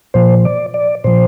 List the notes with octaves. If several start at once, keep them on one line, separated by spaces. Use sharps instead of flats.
A#2 F3 C5
D5
D5
A#2 F3 C5